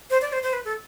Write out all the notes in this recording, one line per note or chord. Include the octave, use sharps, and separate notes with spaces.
C5
D5
C5
C5
B4
A4